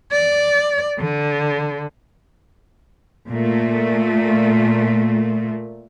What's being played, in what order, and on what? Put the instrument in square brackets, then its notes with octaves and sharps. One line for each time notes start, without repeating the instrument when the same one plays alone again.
[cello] D5
D3
[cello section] A#2 A3